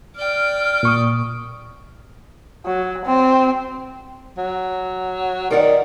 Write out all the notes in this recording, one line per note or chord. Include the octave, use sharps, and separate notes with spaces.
D5 G5 F6
A#2 C#6 D#6
F#3
C4
F#3
D#3 A#4 D5 F#5